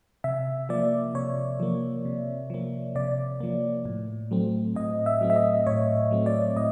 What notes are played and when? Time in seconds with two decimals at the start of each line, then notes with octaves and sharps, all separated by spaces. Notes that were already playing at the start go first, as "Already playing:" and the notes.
0.24 C3 E5
0.69 F3 A#3 D5
1.15 C3 C#5
1.60 F3 A#3
2.05 C3
2.50 F3 A#3
2.95 C3 D5
3.40 F3 A#3
3.85 A2
4.31 F#3 A3 C4
4.76 A2 D#5
5.06 E5
5.21 F#3 A3 C4
5.30 E5
5.36 D#5
5.67 A2 C#5
6.11 F#3 A3 C4
6.26 D5
6.56 A2 D#5